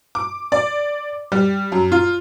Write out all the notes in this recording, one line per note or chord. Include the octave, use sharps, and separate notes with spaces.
D6
D5
G3
F#2
F4